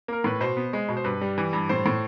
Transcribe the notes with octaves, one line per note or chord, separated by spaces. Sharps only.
A#3 A#4
A2 B4
B2 C5
B3
G#3
B2
C5
G2 B4
G3
E3
G2
A2 C5
A2